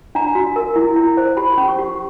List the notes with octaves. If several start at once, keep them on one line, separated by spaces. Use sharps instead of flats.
D4 A#5
F#4
A#4
E4
E4
C5
G4 B5
C6
C#4
C#6
G4